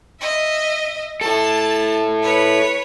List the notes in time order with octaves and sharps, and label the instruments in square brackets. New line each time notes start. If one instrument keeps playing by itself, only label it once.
[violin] D#5 E5
[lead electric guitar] E4 A4 [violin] A5
[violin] B4 C#5